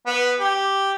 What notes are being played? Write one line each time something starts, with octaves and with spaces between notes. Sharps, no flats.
B3
G4